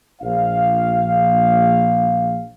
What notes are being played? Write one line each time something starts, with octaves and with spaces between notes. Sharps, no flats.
A#1 F5